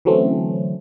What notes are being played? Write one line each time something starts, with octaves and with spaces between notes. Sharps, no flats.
D3 E3 F#3 A3 C4 C#4